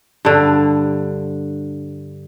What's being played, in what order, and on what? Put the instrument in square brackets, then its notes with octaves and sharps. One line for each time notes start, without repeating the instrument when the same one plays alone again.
[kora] G2 D3